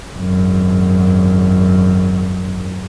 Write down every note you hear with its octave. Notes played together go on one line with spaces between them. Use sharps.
G#1 F#2